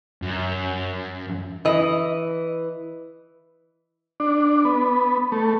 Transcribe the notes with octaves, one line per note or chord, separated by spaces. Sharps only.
F#2
E3 D#5
D4
B3
A3